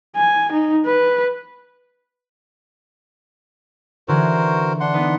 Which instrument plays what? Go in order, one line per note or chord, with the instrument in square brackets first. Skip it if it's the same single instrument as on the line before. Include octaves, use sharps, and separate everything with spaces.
[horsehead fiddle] G#5
D#4
B4
[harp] D3 E3 G#4 [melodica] F#4 A#4 C5
[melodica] D4 F#5 C6
[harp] B3 D#4 B4